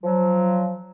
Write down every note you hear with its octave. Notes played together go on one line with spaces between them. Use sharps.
F3 F#3